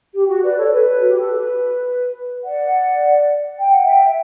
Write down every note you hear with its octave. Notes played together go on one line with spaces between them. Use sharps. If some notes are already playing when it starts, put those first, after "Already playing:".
G4
F#4
B4 D5
A4 C#5
B4
F#4
G4
A4
B4
D5 F#5
G5
F#5
E5 G5